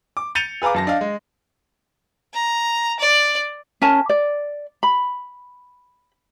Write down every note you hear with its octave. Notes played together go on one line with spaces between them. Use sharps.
D6
G6 A6 C#7 D#7 F7 G7
G#4 B4 F5 A#5 D6
F#2 A5 A#6
D4 D#5 F5
G#3
A#5
D5
C#4 A#4 G#5 A5
D5
B5